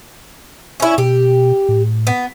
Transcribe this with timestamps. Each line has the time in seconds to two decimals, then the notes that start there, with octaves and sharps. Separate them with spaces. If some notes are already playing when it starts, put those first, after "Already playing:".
0.80 C#4 E4
0.98 B2 G4
1.69 A2
2.07 B3